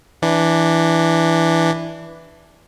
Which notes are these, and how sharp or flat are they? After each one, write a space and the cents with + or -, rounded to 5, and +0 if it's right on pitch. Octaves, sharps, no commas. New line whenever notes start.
E3 +0 D4 +0